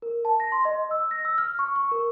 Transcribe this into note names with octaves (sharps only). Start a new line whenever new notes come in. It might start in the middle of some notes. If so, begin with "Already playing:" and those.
A#4
A5
A#6
C6
D#5
E6
A#6
E6
F6
C#6
C#6
A#4